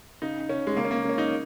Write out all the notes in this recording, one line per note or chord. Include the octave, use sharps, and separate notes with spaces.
C#3 D#4
C#3 C#4
G#3
C#3 A#3
C#4
A#3
C#3 C#4
D#4